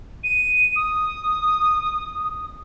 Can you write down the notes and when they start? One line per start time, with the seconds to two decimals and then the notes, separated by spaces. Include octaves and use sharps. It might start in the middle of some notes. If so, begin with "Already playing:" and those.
0.23 D#7
0.75 D#6